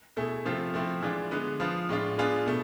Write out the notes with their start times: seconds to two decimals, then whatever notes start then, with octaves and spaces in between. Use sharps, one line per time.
0.17 B2 A3 E4 G#4
0.45 C3 F3 A3 C4 F4
0.74 F3 A3 C4 E4
1.03 E3 G#3 D4 F4
1.31 D3 G#3 B3
1.60 F3 B3 F4
1.89 A2 G#3 D4 F4
2.18 G#3 B3 D4 F4 G#4
2.46 B2 A3